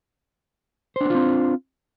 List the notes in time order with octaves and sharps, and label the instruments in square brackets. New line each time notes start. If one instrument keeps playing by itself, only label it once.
[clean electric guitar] C5
D4
B3
F4
C4